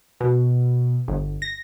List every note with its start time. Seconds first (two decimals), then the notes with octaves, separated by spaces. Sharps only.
0.20 B2
1.08 G1
1.42 A#6